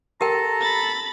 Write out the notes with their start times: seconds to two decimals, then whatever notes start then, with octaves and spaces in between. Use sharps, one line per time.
0.21 G4 A4 A#4 G5 A5 A#5
0.61 B5 A6